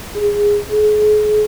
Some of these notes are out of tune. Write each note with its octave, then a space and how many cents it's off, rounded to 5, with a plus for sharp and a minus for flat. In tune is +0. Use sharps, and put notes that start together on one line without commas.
G#4 -15
G#4 +35